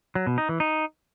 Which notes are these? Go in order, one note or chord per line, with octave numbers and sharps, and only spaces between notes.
F#3
B2
D#4
E3
D#4